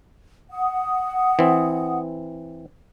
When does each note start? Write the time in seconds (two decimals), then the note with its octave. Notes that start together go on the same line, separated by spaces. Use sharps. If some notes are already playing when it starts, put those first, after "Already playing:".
0.51 F#5 D#6
1.39 E3 C4